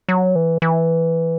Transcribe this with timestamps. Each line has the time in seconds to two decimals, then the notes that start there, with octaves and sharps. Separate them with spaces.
0.09 F#3
0.35 E3
0.62 E3